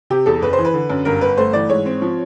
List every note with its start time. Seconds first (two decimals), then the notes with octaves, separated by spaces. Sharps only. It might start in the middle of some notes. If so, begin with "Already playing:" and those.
0.10 C3 G4
0.26 E2 A4
0.42 F#1 B4
0.53 C5
0.59 E3
0.65 B4
0.74 D3
0.90 F#2
1.05 G1 A#4
1.21 G1 B4
1.38 A3 C5
1.53 E3 D5
1.69 G#2 C#5
1.86 C4
2.02 F3